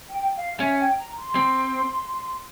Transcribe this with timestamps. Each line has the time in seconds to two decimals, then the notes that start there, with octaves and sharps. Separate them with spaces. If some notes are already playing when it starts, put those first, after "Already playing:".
0.09 G5
0.34 F5
0.59 C#4 E5
0.79 G5
0.97 A#5
1.17 C6
1.35 C4